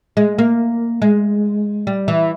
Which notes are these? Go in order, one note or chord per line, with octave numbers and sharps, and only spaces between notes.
G#3
A#3
G#3
G3
E3